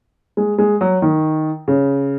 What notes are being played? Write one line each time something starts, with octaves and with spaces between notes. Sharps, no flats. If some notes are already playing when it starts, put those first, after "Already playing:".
G#3
G#3
F#3
D#3
C#3